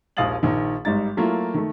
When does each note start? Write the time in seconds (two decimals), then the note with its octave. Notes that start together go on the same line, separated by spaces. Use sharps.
0.17 A#1 D#2 F5 D#6 A6 F#7
0.43 A#1 D#3
0.85 G#1 G3 D#4 A6
1.17 F#3 A3 A#3 E4 F4
1.54 D#3 A3